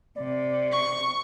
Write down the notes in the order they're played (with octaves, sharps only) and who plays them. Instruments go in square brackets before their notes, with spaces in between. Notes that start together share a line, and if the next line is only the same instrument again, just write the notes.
[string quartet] C3 [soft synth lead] D5
[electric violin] C#6